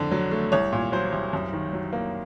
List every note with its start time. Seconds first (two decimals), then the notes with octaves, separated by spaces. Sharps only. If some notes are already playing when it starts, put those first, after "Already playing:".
Already playing: F2 D3
0.11 F#3
0.31 A3
0.52 C2 C#5
0.72 A#2
0.92 F#3 C5
1.13 C2
1.33 F#2
1.53 D#3
1.73 F#3
1.93 A#3